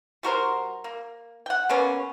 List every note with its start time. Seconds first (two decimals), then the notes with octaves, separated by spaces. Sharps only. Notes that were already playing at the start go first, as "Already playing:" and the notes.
0.23 G3 F#4 A#4 C5
0.84 A#3
1.46 F#5 G5
1.69 C#3 A#3 B3 C#4